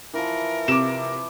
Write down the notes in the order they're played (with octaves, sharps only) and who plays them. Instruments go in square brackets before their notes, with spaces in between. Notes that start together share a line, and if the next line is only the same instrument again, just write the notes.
[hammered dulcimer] E3 F3 [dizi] A#4
[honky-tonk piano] C3 [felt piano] D6 E7